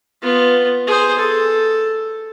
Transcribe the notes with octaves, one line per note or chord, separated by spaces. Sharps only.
B3 F4
G#4 C5
A4